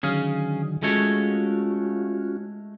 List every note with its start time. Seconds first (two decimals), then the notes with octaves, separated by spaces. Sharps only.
0.03 D3 D#3 F#3 C#4 G#4 F5
0.83 G#3 A3 C#4 F4 F#4 C#5